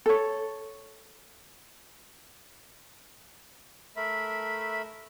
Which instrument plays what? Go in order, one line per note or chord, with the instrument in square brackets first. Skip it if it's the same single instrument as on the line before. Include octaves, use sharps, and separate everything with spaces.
[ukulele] A4 C#5
[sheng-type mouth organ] A3 A#4 E5 B5